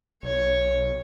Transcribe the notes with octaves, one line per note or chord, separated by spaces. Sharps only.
B1 C#5 C#6